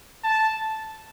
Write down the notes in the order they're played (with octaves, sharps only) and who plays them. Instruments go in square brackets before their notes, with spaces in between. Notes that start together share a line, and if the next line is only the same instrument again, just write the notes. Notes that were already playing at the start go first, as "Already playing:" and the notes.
[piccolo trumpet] A5